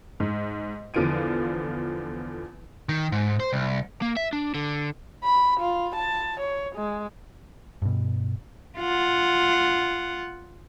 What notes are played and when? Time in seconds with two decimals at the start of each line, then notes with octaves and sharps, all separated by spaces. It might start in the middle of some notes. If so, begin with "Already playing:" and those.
0.20 G#2
0.94 E2 D3 F3 F4 D7 D#7
2.89 D#3
3.12 G#2
3.40 C5
3.53 C2
4.02 A#3
4.17 E5
4.33 D4
4.54 D3
5.24 B5
5.60 F4
5.96 A5
6.40 C#5
6.75 G#3
7.82 G2 B2
8.78 F4 F#5